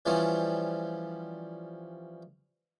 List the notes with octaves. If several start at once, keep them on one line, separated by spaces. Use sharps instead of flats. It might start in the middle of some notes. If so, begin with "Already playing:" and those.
E3 F3 G3 C#4